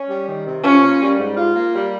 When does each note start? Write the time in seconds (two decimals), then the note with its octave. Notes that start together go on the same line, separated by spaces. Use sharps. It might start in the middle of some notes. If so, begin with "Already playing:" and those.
Already playing: C#4
0.09 G3
0.27 D#3
0.45 C3
0.63 C#4 F4
0.81 A#3
1.00 G3
1.18 G#2
1.36 F4
1.54 A#3
1.74 G3